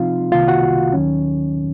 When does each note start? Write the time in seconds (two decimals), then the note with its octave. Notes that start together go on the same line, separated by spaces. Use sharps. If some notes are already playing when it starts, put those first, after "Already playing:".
Already playing: C3 F3 C4 D#4 F4 F5
0.32 C2 C3 D#3 A#3 F4 F5
0.48 F#4 F#5
0.93 D#2 D#3 F#3 C#4